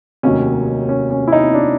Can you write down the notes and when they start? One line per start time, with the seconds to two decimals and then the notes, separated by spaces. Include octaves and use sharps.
0.23 F1 D#2 D#3 F#3 C#4
0.89 C#4
1.10 C#4
1.28 E4
1.33 D#4
1.54 D4